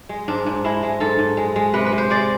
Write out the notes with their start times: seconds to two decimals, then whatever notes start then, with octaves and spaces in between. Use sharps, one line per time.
0.09 G#3
0.28 G#2 D4
0.46 G#2
0.64 G#3 E4
0.83 G#3
1.00 G#2 A4
1.19 G#2
1.37 G#3
1.56 G#3
1.74 C3 B4
1.86 B4
1.92 C3
1.98 C5
2.10 G#3 D5